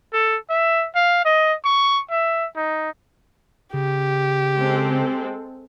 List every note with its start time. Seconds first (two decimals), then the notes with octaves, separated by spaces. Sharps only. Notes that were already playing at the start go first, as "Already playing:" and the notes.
0.13 A4
0.50 E5
0.95 F5
1.25 D#5
1.65 C#6
2.10 E5
2.56 D#4
3.74 C#3 G4
4.56 G#3 C4 A4